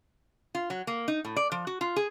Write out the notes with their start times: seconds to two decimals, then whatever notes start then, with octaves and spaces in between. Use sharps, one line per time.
0.55 F4
0.70 F#3
0.87 A#3
1.08 D#4
1.25 A2
1.36 D5
1.52 F3
1.67 F#4
1.81 F4
1.96 G#4